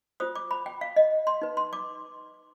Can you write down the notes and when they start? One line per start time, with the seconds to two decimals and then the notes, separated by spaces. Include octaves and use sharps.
0.20 F4 C5 D#6
0.35 D6
0.51 B5
0.66 G5
0.81 F5
0.96 D#5
1.27 C6
1.42 D#4 B4
1.57 C6
1.73 D6